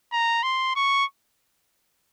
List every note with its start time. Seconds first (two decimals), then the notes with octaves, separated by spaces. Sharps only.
0.12 A#5
0.43 C6
0.76 C#6